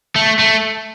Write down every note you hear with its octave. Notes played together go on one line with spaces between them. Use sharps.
A3
A3